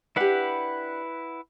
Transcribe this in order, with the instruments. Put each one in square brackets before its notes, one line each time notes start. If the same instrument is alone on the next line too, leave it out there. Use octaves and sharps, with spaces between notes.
[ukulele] D4 G4 [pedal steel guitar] E4 B4 F#5